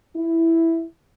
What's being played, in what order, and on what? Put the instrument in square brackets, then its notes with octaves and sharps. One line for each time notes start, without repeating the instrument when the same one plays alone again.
[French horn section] E4